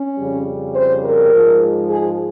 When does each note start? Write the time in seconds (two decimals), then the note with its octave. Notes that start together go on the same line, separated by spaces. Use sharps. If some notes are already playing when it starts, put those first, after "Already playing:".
Already playing: C#4
0.19 F2 C#3 G3
0.75 C5
1.04 A#4
1.33 G#2 F3 G#3
1.90 G#4